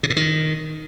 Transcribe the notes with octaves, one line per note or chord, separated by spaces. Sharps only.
C3
A2
D#3